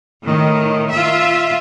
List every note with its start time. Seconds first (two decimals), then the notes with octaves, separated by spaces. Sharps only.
0.22 A2 D#3
0.92 F4 E5